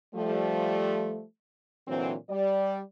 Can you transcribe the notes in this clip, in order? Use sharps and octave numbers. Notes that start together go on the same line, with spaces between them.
F3 G3 A3
A#2 D3 E3 F#3 C4
G3 D5